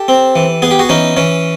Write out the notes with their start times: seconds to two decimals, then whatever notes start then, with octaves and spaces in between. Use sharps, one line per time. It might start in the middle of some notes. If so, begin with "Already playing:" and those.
Already playing: G4 A4
0.08 C4
0.36 E3
0.62 B3 G#4
0.71 G4
0.79 F#4 G#4
0.89 E3 C#4 D#4
1.17 E3 C#4